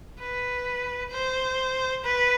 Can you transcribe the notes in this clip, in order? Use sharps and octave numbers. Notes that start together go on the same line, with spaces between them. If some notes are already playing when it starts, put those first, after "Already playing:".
B4
C5
B4